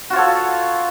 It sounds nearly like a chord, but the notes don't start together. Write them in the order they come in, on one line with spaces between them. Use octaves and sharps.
F#4 F4 C#5 A4